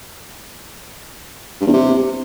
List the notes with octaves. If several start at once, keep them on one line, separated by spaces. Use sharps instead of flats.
G2
E2
C3